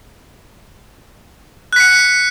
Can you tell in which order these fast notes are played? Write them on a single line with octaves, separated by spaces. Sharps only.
F#6 B6 C#7